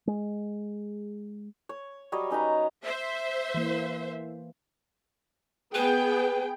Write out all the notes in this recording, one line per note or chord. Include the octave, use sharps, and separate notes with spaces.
G#3
C#5
F#3 G3 C#5 D#5
C#4 D#4 B4 A#5
C5 E5
E3 A#3
B3 G#4 B4 G5